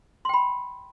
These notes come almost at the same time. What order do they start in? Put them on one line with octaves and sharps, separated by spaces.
C6 G5 B5